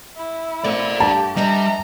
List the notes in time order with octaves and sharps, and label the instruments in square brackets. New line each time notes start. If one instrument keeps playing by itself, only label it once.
[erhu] E4
[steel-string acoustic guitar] A3 C4 [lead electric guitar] A#4 D5
[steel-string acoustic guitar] G2 [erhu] G4 [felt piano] A5
[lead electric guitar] G3 [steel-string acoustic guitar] B4 D#5 E5 [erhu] A#5